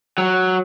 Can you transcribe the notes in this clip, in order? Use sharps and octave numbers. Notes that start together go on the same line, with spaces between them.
F#3